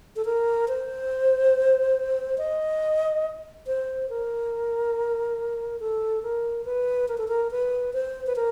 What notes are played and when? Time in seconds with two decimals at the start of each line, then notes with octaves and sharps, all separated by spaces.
0.16 A4
0.25 A#4
0.68 C5
2.38 D#5
3.67 C5
4.09 A#4
5.80 A4
6.23 A#4
6.65 B4
7.08 A#4
7.18 A4
7.28 A#4
7.51 B4
7.93 C5
8.27 B4
8.36 A#4